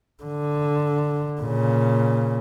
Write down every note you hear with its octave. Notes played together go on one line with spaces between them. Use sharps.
D3
A#2 C#3